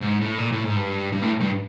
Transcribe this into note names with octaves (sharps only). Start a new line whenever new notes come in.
G#2
A2
A#2
A2
G#2
G2
G2
A2
G2